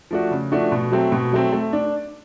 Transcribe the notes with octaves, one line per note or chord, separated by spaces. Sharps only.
F3 A3 D4 F#4
C#3
F3 A3 D4 F#4
B2
F#3 A3 C4
B2
F#3 A3 C4
A3
D4